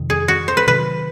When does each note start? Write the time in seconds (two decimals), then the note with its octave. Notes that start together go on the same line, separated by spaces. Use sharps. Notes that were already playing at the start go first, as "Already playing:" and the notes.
Already playing: F2 C3 D#3
0.10 G#4
0.28 F#4
0.48 C5
0.57 B4
0.67 C3 D#3 F#3 B4